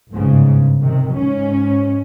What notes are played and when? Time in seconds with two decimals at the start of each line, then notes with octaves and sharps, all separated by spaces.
0.13 G1 G#2 C#3
0.80 C3 D#3
1.14 G#2 C#4